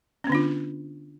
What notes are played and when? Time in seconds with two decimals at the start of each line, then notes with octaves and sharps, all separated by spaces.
0.24 C#4
0.27 B3
0.30 D3
0.32 D4
0.35 F4